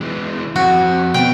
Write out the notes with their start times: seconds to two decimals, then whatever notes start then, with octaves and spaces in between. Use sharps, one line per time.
0.01 E3 G#3
0.56 F2 F#4
1.14 B2 G5